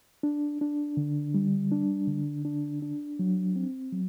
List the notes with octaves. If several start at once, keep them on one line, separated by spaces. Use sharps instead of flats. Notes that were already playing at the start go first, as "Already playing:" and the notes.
D4
D4
D3
G3
D4
D3
D4
D4
F#3
C4
F#3